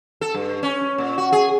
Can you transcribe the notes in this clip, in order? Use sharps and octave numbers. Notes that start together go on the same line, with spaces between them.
A4
G2
C#4
A#2
F#4
G#4